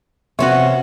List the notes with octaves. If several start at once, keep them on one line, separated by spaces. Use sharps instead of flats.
C3 B3 C#4 F#4 C#5 E5 C6